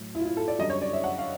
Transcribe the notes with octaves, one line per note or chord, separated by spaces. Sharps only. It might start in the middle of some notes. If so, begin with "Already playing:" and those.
Already playing: A2 F#3
E4
F4
E4
A4
D5
F#2 D3 G3 D#5
C#5
D5
E5
F#5
F5